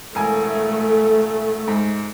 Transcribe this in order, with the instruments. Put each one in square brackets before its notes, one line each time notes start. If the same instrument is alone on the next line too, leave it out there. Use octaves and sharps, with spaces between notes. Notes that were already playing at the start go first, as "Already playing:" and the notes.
[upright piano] E1 G#5 [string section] A3
[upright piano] G#2